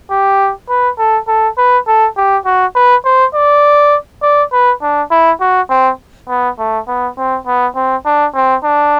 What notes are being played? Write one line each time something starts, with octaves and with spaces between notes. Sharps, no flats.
G4
B4
A4
A4
B4
A4
G4
F#4
B4
C5
D5
D5
B4
D4
E4
F#4
C4
B3
A3
B3
C4
B3
C4
D4
C4
D4